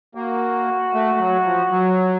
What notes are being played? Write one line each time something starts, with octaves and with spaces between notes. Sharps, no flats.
A#3 F#4
A3
A3
F#3
F3
F#3